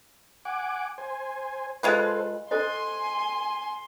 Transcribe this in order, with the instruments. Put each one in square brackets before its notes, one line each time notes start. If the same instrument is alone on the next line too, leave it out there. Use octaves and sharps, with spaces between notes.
[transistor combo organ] F#5 G#5 D6
C5 G#5
[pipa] G#3 F4 B4 [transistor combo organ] A4 C5
[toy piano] A4 C5 D#5 [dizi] G#5 [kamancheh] C6